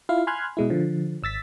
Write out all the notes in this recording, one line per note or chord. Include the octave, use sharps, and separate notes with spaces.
E4 F4 F5
G#5 B5 C6 F6 F#6 G#6
B2 G#3 E4
D3 F3
G#1 E6 A6 B6